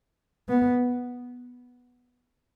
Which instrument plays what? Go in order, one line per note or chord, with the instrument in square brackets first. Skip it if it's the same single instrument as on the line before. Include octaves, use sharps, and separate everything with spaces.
[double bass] B3